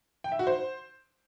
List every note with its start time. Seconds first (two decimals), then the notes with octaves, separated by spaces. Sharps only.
0.24 G5
0.32 E5
0.39 F#4
0.47 C5